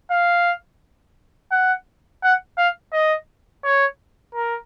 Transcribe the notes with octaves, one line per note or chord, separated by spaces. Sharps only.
F5
F#5
F#5
F5
D#5
C#5
A#4